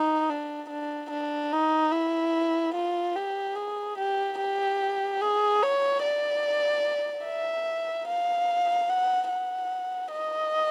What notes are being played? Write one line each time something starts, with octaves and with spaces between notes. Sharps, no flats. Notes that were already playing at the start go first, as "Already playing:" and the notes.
Already playing: D#4
D4
D4
D4
D#4
E4
F4
G4
G#4
G4
G4
G#4
C#5
D5
E5
F5
F#5
F#5
D#5